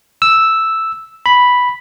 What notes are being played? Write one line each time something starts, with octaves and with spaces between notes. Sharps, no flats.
E6
B5